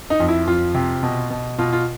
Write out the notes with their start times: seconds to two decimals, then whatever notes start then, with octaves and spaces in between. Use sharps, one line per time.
0.10 D#4
0.20 F2
0.29 E4
0.47 F2 F4
0.75 C3
1.03 B2
1.30 B2
1.59 B2 F4
1.73 F4